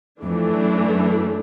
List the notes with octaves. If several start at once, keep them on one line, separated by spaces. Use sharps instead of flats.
F2 E3 A3 D4
F#2
F#2